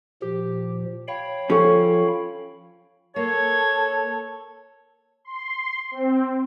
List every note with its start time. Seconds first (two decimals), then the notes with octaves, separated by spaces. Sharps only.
0.22 A#2 F3 G4
1.08 C#5 F5 G5 B5
1.50 F3 C#4 A4 C#6
3.16 A#3 A4 C#5 G#6
5.25 C6
5.91 C4